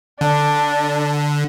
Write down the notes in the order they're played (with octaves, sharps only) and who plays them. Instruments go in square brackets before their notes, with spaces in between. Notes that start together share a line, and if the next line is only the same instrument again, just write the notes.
[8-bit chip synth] D3 [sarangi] D4